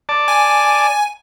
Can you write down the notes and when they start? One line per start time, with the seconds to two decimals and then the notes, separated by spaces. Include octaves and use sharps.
0.09 D5 A5
0.28 G#5